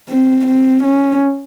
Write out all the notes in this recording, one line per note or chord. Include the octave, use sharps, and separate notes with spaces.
C4
C4
C#4